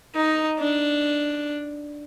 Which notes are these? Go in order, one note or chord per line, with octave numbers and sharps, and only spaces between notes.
D#4
D4